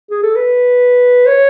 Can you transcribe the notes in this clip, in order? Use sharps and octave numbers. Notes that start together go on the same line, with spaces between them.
G#4
A4
B4
C#5